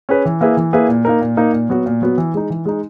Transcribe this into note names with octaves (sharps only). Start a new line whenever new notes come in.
C#4 G#4 B4
E3
A#3 E4 G#4 B4
E3
A#3 E4 G#4 B4
A#2
A#3 D#4 A#4
A#2
A#3 D#4 A#4
A#2
F#3 B3 F#4
A#2
F#3 B3 F#4
E3
G#3 D#4
E3
G#3 D#4